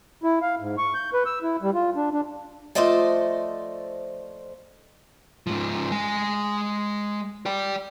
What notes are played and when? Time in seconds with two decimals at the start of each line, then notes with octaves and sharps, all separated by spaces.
0.23 E4
0.42 F5
0.60 G#2
0.78 C#6
0.94 G6
1.13 B4
1.26 E6
1.43 E4
1.62 G3
1.75 F4
1.96 D4
2.13 D4
2.75 F3 A3 C5 D5 D#5 A5
5.47 G#2 F3
5.91 G#3 G#5
7.46 D5 G5